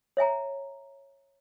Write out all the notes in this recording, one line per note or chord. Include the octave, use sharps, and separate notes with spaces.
C#5 E5 G#5 A#5